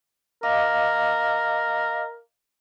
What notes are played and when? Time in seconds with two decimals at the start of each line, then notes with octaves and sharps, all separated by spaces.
0.43 A#4 D#5 F5 D6